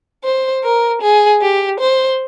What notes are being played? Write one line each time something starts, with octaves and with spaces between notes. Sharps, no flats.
C5
A#4
G#4
G4
C5